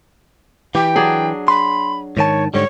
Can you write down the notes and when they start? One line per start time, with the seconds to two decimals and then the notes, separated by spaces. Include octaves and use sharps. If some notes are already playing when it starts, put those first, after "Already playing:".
0.75 E3 G4 G5
0.96 F#3 D4 G#4
1.48 B5 C6
2.17 G#2 D#3 C#5 A5
2.54 G#2 D3 G3 C#5